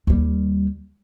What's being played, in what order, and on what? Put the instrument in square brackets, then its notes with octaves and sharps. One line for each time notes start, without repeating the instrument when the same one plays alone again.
[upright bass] D#2 G3